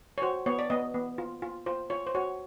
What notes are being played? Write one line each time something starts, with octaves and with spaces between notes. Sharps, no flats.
C#5
F#4 C5
B3 C#5
D5
B3 D#5
B3
F4
F4
F4 C5
F4 C#5
C5
F#4 C#5